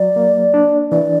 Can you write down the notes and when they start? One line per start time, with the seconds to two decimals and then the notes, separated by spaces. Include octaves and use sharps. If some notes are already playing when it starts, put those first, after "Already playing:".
Already playing: F#3 D5
0.16 A#3
0.54 D4
0.92 E3 D5